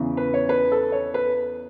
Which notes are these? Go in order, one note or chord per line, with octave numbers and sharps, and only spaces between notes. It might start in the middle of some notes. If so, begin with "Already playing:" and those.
Already playing: E2 C#3 E3
B4
C#5
B4
A4
C#5
B4